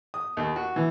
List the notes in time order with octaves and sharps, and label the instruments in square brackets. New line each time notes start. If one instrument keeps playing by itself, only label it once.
[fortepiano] D#6
D#2
F#4
E3